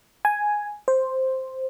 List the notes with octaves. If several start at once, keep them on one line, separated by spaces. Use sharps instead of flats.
G#5
C5